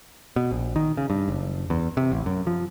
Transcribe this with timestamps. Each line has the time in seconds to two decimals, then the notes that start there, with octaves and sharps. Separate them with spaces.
0.36 B2
0.51 A#1
0.76 D#3
0.97 C#3
1.10 G2
1.28 F#1
1.70 E2
1.97 C3
2.12 A1
2.26 F#2
2.47 F3